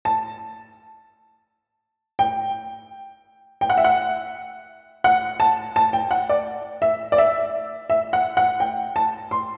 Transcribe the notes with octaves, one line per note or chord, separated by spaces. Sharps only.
A5
G5
G5
F#5
E5
F#5
F#5
A5
A5
G5
F#5
D5
E5
D5
E5
E5
F#5
F#5
G5
A5
C6